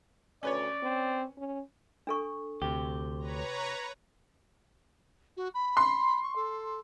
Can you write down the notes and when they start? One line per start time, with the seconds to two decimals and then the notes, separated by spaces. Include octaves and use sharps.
0.43 D2 C#4 B4 C#5 D5
0.83 C4
1.38 C#4
2.07 D4 A4 C#6
2.62 D2 C3 G4
3.19 B4 C#5 A#5
5.37 F#4
5.54 B5
5.77 C6
6.23 C#6
6.36 A4